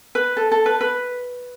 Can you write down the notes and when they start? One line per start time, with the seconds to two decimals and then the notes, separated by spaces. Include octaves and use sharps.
0.15 B4
0.37 A4
0.52 A4
0.66 B4
0.81 B4